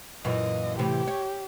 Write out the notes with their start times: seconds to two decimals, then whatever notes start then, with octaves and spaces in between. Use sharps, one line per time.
0.25 F#2 A#2 E3 D#5
0.79 A2 C3 E3 G4
1.08 C#5